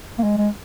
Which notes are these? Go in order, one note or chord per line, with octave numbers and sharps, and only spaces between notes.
A#3
G#3
G#3